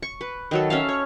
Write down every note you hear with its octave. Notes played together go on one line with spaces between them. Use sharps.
C#6
B4
D#3 F#3 A4
C#4 E5 F5
C#5